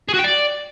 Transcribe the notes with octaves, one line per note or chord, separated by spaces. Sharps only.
G#4
F#4
G5
D5